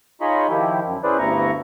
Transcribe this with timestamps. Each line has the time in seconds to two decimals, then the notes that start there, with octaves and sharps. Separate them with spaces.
0.21 D#4 F4 G#4 C#5 D#5 B5
0.50 D#3 F3 E4 G4
0.86 F#2
1.04 C#4 E4 G#4 B4 C5 D5
1.18 D2 G2 B3 E4 A#5 C#6